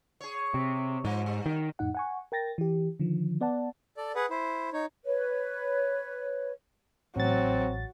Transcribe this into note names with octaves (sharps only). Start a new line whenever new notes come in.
G#4 C#5
C3
G#2 F3
G3
D#3
F2 A2 D#4 F#5
F#5 G#5 C#6
A#4 G5 A6 A#6
E3 G4
D3 D#3 F3
B3 D5 F#5 A5
A4 D5
G#4 B4 F#5
E4 C5
D#4 C#5
B4 C#5
A1 F#3 C4 A6